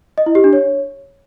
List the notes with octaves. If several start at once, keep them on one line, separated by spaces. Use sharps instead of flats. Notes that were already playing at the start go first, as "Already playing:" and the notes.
D#5
E4
G4
D4
C#5